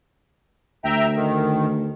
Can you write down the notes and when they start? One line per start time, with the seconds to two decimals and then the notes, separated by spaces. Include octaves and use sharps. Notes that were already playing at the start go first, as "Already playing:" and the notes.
0.85 D2 E5 G5 A#5
1.15 D#3